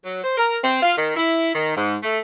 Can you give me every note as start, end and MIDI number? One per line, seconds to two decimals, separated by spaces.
0.05 0.20 54
0.24 0.37 72
0.38 0.57 70
0.63 0.80 60
0.83 0.97 65
0.97 1.15 51
1.17 1.50 64
1.54 1.73 51
1.77 1.95 44
2.02 2.19 57